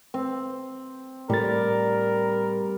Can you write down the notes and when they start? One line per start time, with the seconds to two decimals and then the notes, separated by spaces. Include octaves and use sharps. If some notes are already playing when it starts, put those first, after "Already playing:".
0.14 C4
1.30 A2 G3 A#4 A6